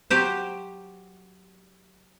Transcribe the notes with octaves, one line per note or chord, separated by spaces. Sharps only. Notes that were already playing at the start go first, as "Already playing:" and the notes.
F#3 G4 C5